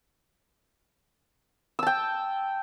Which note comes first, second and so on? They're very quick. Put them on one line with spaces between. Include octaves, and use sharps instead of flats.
E6 A5 G5